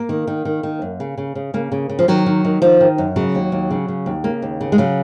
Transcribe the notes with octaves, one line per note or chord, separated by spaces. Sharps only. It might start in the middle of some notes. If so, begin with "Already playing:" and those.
Already playing: A#3
D#3
D#3
D#3
D#3
F#2
C#3
C#3
C#3
C#3 A#3
C#3
C#3
F3
D#3 F#3
D#3
D#3
D#3 F3
D#3
F#2
C#3 F#3
D#2
D#2
C#3
C#3
D#2
C#3 A#3
D#2
C#3
G#3
C#3 F#3